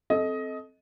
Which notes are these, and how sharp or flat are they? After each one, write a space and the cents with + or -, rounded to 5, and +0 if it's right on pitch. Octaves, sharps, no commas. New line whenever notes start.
C4 +0 A4 -20 D#5 +15